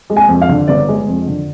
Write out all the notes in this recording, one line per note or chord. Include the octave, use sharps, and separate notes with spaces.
G#3
G#5
F2
F5
D3
G1 D5
G#3
F2
D3